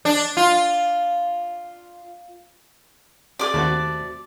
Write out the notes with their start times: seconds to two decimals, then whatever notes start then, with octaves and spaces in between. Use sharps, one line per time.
0.05 D4
0.37 F4
3.39 G4 G#4 D5 D6
3.54 D#2 A3 C4 F#4